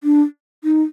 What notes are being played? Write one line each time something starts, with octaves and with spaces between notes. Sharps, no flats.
D4
D#4